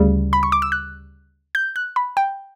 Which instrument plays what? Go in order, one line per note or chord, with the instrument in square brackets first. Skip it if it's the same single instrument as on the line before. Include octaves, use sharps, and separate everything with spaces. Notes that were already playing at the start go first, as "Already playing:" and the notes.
Already playing: [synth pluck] D2 C#3 G3
B5
C#6
D6
E6
F#6
G6
F#6
B5
G5